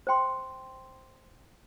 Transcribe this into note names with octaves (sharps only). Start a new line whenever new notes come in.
C5 G5 C6